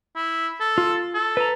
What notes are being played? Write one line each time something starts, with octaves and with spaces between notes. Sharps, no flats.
E4
A4
F4
A4
B4 A#5